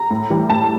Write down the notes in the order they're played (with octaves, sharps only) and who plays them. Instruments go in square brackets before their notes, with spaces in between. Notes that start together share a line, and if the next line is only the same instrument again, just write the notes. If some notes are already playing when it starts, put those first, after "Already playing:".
Already playing: [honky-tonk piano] A#5
A2
E3 G3
A2 A5